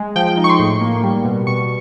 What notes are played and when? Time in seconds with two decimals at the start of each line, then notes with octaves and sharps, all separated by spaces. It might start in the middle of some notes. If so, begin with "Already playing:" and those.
Already playing: G#3
0.16 F3 G5
0.27 G5
0.37 D#4
0.44 C#6
0.49 C6
0.59 A2
0.81 A#3
1.03 G3
1.25 B2
1.47 B2 C#6